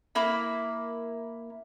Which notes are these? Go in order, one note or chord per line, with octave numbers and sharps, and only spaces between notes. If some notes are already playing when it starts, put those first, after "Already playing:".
A#3 E4 B5